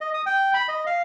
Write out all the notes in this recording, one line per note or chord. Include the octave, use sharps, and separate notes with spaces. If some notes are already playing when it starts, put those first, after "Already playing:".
D#5
D#6
G5
B5
D#5
F5